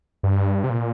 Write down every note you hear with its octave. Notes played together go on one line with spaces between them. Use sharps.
G2
C3
A#2